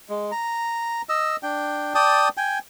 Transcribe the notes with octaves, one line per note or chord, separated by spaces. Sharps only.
G#3
A#5
D#5 E6
D4 G5
D5 G5 A5 D#6
G5 G#5